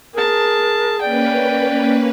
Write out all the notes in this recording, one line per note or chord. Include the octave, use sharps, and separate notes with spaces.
G#4 A#4 A5
A#3 C#4 B4 D5 G5